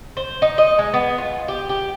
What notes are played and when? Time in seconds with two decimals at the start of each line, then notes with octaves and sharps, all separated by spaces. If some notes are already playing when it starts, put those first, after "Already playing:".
0.17 C5
0.42 D#4
0.58 D#5
0.79 G#3
0.94 B3
1.18 F4
1.48 G4
1.69 G4